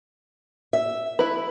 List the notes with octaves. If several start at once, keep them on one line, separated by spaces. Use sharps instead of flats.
E5
E4 B4